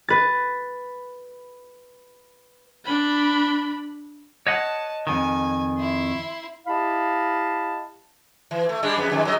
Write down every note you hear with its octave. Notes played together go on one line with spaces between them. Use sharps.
B4 A6
D4 B5
C#5 D#5 F#5 A5
F2 D#3 G#5
E4 C6
E4 G4 D#5 F5 A5 B5
E3
A3
G3 G#3 D4
F2 B3
F2 D#3 G#3
F#3 C#4 D#5